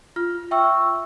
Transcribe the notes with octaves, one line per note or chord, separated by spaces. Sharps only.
F4 F6
E5 G5 C#6 E6